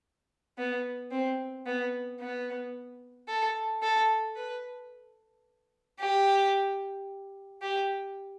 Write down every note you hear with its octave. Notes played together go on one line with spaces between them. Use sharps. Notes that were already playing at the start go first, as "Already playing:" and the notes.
B3
C4
B3
B3
A4
A4
B4
G4
G4